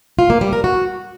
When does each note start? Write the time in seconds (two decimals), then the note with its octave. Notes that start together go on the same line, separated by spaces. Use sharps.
0.19 F4
0.30 A#3
0.41 G3
0.53 A#4
0.64 F#4